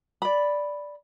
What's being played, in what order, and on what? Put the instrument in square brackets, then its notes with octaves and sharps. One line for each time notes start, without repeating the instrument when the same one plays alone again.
[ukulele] D5 B5